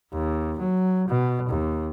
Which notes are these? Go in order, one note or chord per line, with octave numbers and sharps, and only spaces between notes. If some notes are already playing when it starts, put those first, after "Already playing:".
D#2
F#3
B2
D#2